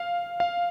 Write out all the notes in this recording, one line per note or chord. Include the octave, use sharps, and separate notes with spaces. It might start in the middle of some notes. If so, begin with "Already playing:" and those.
Already playing: F5
F5